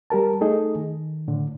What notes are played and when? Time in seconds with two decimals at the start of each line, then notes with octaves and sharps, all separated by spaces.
0.10 G3 G4 A#4 A5
0.41 A3 D#4 G#4 A4 D#5
0.76 D#3
1.28 A2 D3